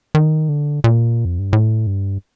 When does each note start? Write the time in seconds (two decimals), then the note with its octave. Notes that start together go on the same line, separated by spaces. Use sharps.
0.15 D#3
0.49 D3
0.84 A#2
1.25 F2
1.39 G2
1.53 A2
1.87 G2